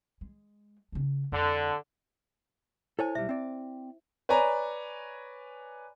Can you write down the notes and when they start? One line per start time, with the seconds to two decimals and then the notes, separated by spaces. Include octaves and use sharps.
0.21 G#3
0.92 C#3 D4
1.32 F2 D3
2.99 E4 A4 C5 C#5 G#5
3.15 B1 G3 E5
3.29 C4 D5
4.29 B4 C#5 D5 G#5 A#5